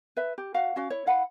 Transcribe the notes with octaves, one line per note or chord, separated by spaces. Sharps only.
B4 E5
G4
F#4 F5 F#5
C#4 F#4 F5
E4 C#5
E4 F5 F#5 B5